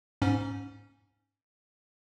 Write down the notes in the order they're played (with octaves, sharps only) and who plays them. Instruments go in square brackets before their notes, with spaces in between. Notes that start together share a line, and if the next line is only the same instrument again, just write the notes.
[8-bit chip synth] G#2 C#4